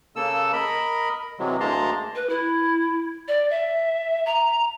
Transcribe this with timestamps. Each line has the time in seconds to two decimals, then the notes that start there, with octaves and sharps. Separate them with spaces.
0.16 C#3 A#3 A4 E6
0.53 A#4 D#5 B5
1.39 C3 E3 F#3 G#3
1.60 D2 G#3 A#3 A5 A#5 C6
2.15 B4
2.29 E4
3.28 D5
3.50 E5
4.26 A#5